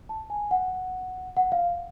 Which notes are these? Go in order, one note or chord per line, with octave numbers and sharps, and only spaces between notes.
A5
G#5
F#5
F#5
F5